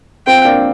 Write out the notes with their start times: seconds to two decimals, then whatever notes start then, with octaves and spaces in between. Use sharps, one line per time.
0.27 C4 F4 G5
0.45 A#3 D4